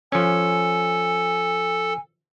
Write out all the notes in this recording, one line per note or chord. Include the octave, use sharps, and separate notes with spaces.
F3 C#4 A4 G#5